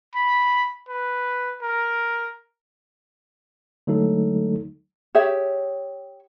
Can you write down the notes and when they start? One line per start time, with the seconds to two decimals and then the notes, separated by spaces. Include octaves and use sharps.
0.15 B5
0.89 B4
1.62 A#4
3.87 D3 F#3 G#3 A3 D#4 A4
5.15 G4 G#4 C#5 E5